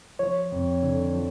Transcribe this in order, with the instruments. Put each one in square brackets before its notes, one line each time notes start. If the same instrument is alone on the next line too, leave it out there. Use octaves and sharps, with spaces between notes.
[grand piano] F3 [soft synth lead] C#5
[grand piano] F2
D3
F3